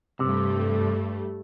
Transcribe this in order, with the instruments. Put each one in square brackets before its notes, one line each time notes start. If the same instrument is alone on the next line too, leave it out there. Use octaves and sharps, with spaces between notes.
[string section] G2 G3 A3 [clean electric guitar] C3